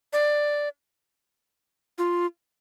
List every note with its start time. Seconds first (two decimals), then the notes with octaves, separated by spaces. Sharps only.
0.13 D5
1.98 F4